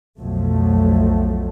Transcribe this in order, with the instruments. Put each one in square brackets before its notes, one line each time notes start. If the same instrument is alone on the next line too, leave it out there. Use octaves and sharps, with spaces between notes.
[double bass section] B1 F2 B2 F3 F#3 A3